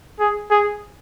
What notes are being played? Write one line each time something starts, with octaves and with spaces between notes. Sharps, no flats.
G#4
G#4